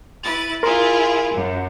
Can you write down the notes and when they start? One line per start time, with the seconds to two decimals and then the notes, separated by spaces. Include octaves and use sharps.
0.23 E4 B4 A6
0.63 E4 F4 G#4 A#4 C6
1.33 F#2